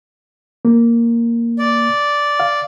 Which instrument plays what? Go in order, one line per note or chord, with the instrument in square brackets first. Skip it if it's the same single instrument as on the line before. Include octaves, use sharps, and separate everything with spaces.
[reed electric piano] A#3
[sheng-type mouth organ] D5
[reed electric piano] F5